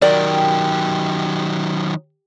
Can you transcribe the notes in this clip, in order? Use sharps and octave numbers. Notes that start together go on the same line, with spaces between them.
D#3 F#3 G4 A#4 D5